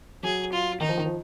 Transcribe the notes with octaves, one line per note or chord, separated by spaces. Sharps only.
F#3 G#4
F4
D#3 D#4
F3
D#3
F3